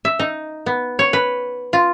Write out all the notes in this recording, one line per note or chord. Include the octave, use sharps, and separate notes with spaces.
E5
D#4
B3
C#5
B4
F4